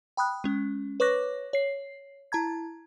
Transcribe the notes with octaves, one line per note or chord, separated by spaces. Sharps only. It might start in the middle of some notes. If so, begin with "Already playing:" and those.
G5 B5 D#6 F#6
G#3 C#4
B4 C#5 C#6 D6 F#6 A#6
C#5 C7
E4 A5 A#5 G#6